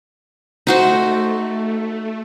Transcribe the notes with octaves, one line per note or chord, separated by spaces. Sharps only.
A3 D#4 F#4 C5